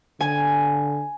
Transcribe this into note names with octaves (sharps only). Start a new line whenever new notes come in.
D3 G#5